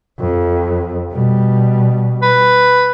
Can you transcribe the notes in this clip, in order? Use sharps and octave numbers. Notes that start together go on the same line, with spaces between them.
F2
B2 G3
B4